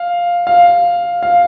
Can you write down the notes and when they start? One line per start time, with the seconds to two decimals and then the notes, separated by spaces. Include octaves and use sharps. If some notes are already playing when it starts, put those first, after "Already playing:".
Already playing: F5
0.47 F5
1.23 F5